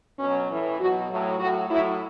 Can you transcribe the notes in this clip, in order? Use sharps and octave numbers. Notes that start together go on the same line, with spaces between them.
B2 F#3 C#4
A2 E3
B2 F#3 F#4
A2 F#3
A2 F#3 F#4
A2 F#3 E4